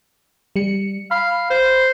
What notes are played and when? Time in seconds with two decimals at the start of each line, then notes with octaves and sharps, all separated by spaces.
0.56 G3 C#7
1.11 F5 B5
1.50 C5